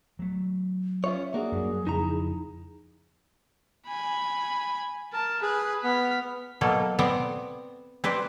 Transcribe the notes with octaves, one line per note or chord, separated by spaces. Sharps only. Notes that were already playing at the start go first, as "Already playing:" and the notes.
F#3 A3
C#4 F4 C#5 E5
A#3 D4 F#4 G#4
F#2 G3
F2 C#3 D#4 E4 A#5
G#5 B5
A#4 A5
G#4 B4
B3 F6 B6
B2 F#3 A#3 A4
B3 C4 C5 D5 F#5
C4 B4 C5 D5